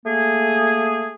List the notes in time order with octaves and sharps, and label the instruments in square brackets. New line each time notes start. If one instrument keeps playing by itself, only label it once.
[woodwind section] A3 A#3 G#4